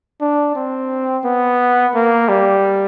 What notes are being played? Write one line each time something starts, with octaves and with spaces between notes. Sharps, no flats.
D4
C4
B3
A#3
G3